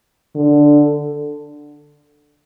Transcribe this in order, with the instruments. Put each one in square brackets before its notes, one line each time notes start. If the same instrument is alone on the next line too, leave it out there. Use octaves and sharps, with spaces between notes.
[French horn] D3